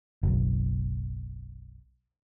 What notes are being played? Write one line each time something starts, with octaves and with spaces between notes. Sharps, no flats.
F#1 B1